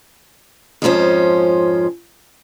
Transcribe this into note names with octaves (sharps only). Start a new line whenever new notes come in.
F2 G#2 F3 C#4 C5